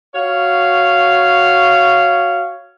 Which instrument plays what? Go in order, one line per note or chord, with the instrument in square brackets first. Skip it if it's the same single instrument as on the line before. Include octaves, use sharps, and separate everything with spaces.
[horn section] F#4 C#5 F5